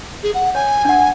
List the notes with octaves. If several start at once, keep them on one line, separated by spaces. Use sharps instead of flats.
G#4
F#5
C#5 G#5
D4 F#5